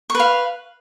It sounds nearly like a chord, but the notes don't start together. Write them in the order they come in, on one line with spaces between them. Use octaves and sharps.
C#6 B4 F5